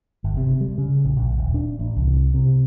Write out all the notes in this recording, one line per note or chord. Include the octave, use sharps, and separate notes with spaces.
G1
C3
G3
C#3
A#1
A#1
D#1
D4
A1
C2
C3